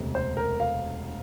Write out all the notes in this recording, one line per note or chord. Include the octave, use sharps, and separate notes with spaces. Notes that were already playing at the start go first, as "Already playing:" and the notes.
Already playing: E1 D2 C3
C5
A#4
F5